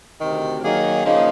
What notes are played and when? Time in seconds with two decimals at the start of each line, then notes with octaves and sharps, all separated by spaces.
0.20 D2 C3 D#3
0.62 D#3 F#3 A#3 D#4 G#4
1.04 C#3 F3 A#3 D#4